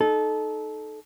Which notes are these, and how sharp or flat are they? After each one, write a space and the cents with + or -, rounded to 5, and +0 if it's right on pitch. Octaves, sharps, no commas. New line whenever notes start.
D#4 -10 A4 -20